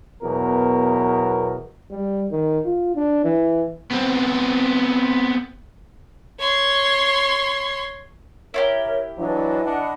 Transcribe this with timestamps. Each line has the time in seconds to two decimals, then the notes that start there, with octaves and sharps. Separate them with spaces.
0.22 E2 B2 F#3 A#4
1.91 G3
2.32 D#3
2.65 F4
2.96 D4
3.24 E3
3.91 B3 C4
6.39 C#5 C6
8.54 E4 F4 G4 A#4 C#5
9.18 E3 F#3 D4 D#5
9.64 D4 D#5 F#5 B5